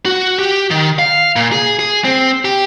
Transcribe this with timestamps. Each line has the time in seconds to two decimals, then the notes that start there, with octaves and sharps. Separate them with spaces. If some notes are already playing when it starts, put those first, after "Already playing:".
0.05 F#4
0.39 G4
0.71 D#3
0.99 F5
1.36 A#2
1.52 G#4
1.79 G#4
2.05 C4
2.45 G4